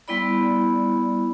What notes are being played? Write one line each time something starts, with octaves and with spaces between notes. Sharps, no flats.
G3 B3 E4 D5 B5